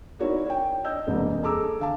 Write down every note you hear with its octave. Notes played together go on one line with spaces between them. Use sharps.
D#4 E4 F#4 A#4 C#5 D5
C#5 G5
D#5 E6 G6
E1 C2 A#3 D#5
G#4 A4 A5 A#5 D6 E6
D3 F5 A5